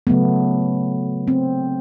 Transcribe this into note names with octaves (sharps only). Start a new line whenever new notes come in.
C#3 F#3 A3 B3
C4